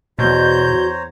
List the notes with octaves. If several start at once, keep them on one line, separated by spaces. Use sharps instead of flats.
E2 B2 F#4 C5 C#5 A#5 G6